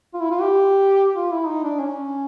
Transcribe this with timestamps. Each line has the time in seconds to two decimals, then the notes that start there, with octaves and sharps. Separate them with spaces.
0.14 F4
0.20 E4
0.31 F4
0.41 G4
1.16 F4
1.31 E4
1.47 D#4
1.64 D4
1.80 C#4